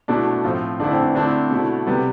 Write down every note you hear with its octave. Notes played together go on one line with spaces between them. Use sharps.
B2 A3 D4 E4
A2 F3 C4 F4
D3 A3 D4 E4
C4
D4
D3 A3 C4 D4 E4
B2 A3 E4
C3 G3 B3